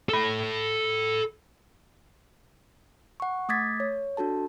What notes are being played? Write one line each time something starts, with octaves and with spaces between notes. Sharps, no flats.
A4 B5
F#5 C#6
A3 D6 D#6 G#6 A6 B6
C#5
D4 F#4 A4 A5